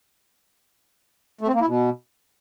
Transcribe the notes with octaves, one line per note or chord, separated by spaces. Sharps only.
A3
C4
A#3
E4
B2